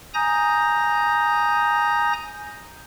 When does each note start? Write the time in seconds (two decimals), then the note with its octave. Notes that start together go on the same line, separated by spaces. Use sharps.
0.14 G#5 A#5 D#6 G6 A#6